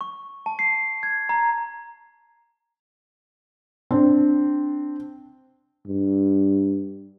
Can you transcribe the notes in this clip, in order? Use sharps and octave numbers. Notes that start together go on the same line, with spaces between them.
C#6
A5
C7
G#6
A#5
C4 D4
G2